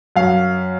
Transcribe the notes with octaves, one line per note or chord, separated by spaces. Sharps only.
F#2 F5